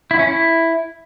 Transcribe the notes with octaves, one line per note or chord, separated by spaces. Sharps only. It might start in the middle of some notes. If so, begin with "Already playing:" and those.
E4
C#4
E4